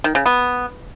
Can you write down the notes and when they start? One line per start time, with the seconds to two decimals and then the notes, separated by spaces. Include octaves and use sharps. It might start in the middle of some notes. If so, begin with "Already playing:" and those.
0.04 D#3
0.15 C#3
0.26 B3